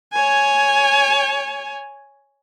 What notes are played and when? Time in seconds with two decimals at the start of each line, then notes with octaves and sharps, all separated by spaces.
0.13 C#5 G#5